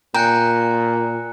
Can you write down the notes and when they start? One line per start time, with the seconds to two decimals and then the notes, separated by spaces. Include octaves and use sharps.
0.14 A#2 G5 G#5 A#5 F#6 C#7